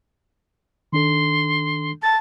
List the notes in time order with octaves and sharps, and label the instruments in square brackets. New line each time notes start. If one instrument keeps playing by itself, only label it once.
[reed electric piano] D#3 D4 A4 [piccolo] C6
[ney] A5 [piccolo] A6